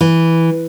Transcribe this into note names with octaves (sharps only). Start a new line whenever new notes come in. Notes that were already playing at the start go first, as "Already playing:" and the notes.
E3